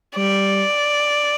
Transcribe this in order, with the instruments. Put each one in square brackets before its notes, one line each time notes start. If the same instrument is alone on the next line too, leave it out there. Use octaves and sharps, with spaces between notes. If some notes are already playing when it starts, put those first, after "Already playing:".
[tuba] G3 [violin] D5